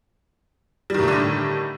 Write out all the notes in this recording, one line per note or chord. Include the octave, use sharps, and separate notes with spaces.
A2 D3 D#3 G3 A3